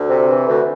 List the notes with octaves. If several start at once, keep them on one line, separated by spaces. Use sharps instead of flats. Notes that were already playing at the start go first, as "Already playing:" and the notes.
Already playing: D2
C3
E3
D2